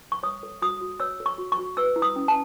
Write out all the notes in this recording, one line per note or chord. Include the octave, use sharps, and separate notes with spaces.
C#6
C#5 D#6
A4
F#4 D#6
F#4
C#5 E6
A4
C#6
F#4
C#6
F#4
B4 E6
E4
D#6
C#4
A5